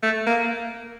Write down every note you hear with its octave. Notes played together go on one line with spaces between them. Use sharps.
A3
A#3